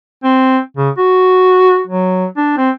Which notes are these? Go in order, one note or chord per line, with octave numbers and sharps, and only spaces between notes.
C4
C#3
F#4
F#3
D4
C4